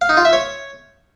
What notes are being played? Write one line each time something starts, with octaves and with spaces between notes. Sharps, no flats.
F5
D#4
F4
E5
C#5